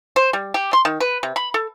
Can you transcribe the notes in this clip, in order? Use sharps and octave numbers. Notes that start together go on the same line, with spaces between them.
C5
G3
G4
C6
D#3
B4
C3
B5
A4